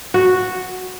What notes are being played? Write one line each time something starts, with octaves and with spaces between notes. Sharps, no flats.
F#4